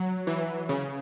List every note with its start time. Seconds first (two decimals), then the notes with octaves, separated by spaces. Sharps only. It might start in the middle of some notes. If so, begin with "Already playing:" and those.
Already playing: F#3
0.27 E3
0.69 C#3